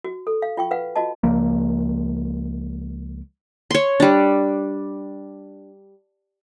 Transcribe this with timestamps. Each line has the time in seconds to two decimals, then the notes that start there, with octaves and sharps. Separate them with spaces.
0.04 F#4
0.27 A4
0.42 F5
0.57 F4 G5 C#6
0.71 B4 F5 F#5
0.96 F4 F#4 D#5 A5
1.23 C#2 F3 A#3
3.71 C#5 C6
4.00 G3 D4